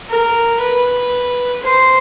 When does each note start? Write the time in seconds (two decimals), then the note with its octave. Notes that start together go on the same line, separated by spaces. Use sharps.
0.09 A#4
0.60 B4
1.63 C5